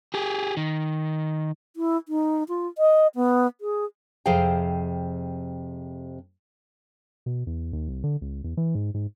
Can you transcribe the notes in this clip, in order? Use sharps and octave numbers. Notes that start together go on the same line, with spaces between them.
G4 G#4
D#3
E4
D#4
F4
D#5
B3
G#4
F2 C3 G#4 C5 F5 G5
B2
E2
D#2
C2
D3
C#2
E2
E3
G#2
G#2